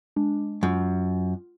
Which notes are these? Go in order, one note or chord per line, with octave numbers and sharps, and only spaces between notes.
G#3 D4
F#2 F4